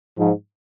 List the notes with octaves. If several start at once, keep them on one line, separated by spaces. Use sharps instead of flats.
G#2 F3